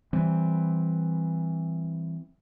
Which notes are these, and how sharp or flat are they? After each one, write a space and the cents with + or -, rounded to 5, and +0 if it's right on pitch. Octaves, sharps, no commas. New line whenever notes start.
E3 +0 G3 +0 C4 +0